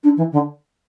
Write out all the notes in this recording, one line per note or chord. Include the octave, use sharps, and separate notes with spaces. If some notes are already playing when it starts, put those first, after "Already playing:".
D4
E3
D3